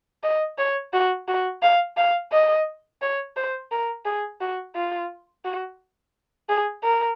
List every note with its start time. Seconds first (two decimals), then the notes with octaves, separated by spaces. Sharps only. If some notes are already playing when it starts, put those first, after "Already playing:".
0.23 D#5
0.58 C#5
0.93 F#4
1.28 F#4
1.62 F5
1.97 F5
2.32 D#5
3.02 C#5
3.37 C5
3.71 A#4
4.05 G#4
4.41 F#4
4.75 F4
5.45 F#4
6.49 G#4
6.83 A#4